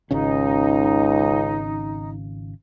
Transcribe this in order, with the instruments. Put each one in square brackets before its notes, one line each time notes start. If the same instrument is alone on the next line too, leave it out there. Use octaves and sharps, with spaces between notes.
[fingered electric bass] G#1 C#3 C#4 [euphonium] C#2 [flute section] D#4